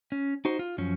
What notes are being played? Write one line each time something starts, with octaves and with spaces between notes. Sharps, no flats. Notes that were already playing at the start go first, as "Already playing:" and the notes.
C#4
D#4 F#4 C5
F4
F#2 F3 C#4